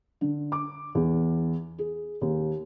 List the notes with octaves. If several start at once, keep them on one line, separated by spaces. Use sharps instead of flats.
D3
D6
E2
G#4
D#2